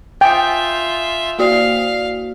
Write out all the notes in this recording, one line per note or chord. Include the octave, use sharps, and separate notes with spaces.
F4 E5 G5 G#5 D#6 G6
A#3 F#4 D5 F5